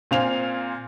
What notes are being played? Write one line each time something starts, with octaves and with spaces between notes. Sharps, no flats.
A#2 C4 F5 G#5 F7